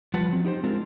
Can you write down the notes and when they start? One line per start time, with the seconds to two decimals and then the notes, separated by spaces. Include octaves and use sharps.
0.14 F3 G3 F4 B4 F#5 A5
0.29 F3 F#3 C4
0.44 D#4 G4 A#4 C5
0.64 G#3 C4 D4 F4 A#4